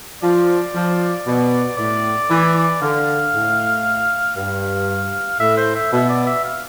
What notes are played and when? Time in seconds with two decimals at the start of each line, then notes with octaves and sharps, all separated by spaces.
0.22 F3 D5
0.74 F3
1.26 B2
1.77 A2 D5
2.29 E3
2.82 D3 F5
3.33 A2
4.36 G2 F5
5.40 A2 E5
5.57 C5
5.75 E5
5.92 B2 E5
6.10 D5
6.27 E5
6.45 F5